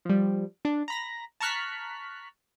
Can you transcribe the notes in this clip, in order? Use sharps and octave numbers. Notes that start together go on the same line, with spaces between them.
F3 G3
D4
A#5 B5 A#6
A5 A#5 C#6 F6 F#6 B6